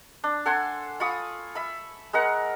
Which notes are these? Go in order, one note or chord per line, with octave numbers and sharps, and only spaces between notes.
D4
A4 F#5 G#5 C6
F4 B5 C#6 D#6
E5 B5
G#3 A#4 F#5